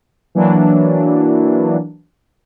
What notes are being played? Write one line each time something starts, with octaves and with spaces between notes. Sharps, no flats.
E3 F#3 A#3 D4